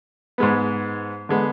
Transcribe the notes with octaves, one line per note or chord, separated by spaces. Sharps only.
G#2 G#3 B3
D3 G#3 B3